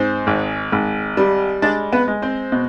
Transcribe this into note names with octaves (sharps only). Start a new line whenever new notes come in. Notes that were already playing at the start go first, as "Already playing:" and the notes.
Already playing: G#2 C4 C5
G#1
G#1
G3
G#3 D4 D5
B3 B4
G#3
C4 C5
B2